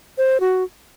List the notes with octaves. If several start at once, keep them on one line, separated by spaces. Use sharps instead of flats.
C5
F#4